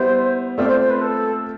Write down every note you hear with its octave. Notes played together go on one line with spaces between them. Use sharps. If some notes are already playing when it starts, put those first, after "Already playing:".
Already playing: G3 B3 E4 C5
A3 C4 F4 D5
C5
C5
B4
A4